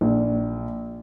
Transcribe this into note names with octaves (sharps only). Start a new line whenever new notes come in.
A#1